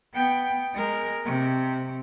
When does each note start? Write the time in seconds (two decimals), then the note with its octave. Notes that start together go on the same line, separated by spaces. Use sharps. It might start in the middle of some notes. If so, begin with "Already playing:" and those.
0.13 B3 G5
0.74 G#3 A#4
1.25 C3